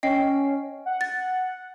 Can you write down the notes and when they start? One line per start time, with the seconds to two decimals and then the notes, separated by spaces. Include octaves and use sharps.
0.03 C#4 D#5 G5 C7
0.85 F#5
1.01 A6